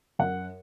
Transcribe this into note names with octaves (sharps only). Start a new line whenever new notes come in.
F#2 F#5